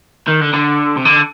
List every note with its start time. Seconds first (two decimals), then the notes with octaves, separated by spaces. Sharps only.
0.28 D#3
0.41 D3
0.54 D3
0.97 C3
1.05 D3